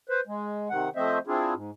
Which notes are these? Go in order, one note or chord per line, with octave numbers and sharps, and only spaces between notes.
B4 C5
G#3
C3 D#3 F#5
F3 A3 C4 C5 D#5 E5
C4 D4 E4 F4 G#4
G#2